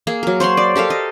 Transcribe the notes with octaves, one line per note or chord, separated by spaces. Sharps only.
A#3 G#4
F#3 A#4
C5 C#5 F#5 C6
D5
G4 A4 A#4 F5
D#5